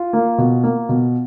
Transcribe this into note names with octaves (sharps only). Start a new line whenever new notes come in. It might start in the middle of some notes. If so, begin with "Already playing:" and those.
Already playing: F4
A#3
B2
A#3
B2